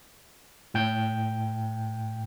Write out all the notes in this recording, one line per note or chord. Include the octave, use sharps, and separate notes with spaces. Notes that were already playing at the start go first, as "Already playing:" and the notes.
A2 G5 G6